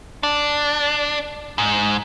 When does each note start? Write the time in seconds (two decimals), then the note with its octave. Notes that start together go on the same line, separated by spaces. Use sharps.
0.23 D4
1.58 G#2